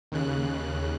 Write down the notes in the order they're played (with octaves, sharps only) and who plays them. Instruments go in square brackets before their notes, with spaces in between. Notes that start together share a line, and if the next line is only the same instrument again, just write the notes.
[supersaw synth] D#2 C#3 F#6